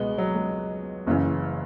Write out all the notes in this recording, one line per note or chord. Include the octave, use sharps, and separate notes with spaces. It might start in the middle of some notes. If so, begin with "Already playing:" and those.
Already playing: C#2 B2 G#3 B3
F#3
G#3
F#1 F#2 C#3 E3